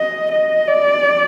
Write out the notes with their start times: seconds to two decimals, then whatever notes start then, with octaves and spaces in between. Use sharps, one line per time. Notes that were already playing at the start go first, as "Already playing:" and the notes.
Already playing: D#5
0.32 D#5
0.68 D5